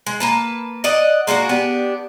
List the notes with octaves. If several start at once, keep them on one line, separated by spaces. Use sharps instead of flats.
G#3
A#3 B4 A5
D5 D#5 F#5
G#3 A#3 D4 F#4
B3 D4 G4